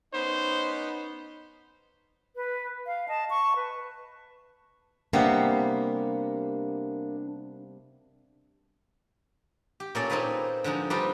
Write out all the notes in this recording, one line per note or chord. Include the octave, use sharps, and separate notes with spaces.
B3 C#4 D#4 C5
B4
F5
D#5 A5
A5 C#6
B4
C3 G3 A#3 B3 D4
G4
A#2 A#3 C#4 F4 A4 D5
A#3 C4 D#4 G#4 B4 F5
D3 F3 G#3 D#4
G3 C4 D4 D#4 F4 B4